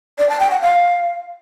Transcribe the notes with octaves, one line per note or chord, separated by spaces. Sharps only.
D5
A5
G5
F#5
F5